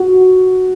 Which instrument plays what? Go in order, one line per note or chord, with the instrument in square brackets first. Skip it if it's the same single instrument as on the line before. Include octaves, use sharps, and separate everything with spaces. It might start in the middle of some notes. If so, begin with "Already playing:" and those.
Already playing: [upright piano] F#4